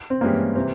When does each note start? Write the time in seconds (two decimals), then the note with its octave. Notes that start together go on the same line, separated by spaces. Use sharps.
0.10 C4
0.21 G2 E3 G#3 A#3 C#4 G4
0.56 C3 E3 C4